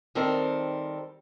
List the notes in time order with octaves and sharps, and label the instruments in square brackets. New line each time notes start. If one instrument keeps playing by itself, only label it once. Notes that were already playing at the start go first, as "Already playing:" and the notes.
[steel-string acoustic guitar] D#3 G3 C4 A4 A#4 C5